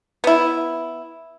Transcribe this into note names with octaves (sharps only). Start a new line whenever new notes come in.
B3 E4